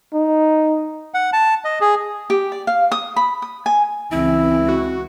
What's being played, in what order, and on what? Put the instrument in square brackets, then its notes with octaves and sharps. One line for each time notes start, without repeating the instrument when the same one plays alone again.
[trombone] D#4
[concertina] F#5
A5
D#5
G#4
[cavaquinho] G4
D5
F5
D#6
B5
D#6
G#5
[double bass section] C#2 E3 [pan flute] C4 [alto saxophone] E4
[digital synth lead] F#4